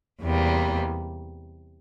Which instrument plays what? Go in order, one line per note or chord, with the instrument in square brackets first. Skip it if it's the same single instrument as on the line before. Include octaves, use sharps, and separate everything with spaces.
[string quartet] E2 C3 G3 A#3